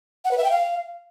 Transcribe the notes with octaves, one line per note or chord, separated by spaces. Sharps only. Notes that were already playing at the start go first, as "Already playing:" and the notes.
F#5
B4
E5
G5
F5